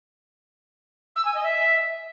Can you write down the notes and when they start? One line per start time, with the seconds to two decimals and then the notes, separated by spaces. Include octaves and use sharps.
1.16 E6
1.25 G#5
1.34 D#5
1.43 E5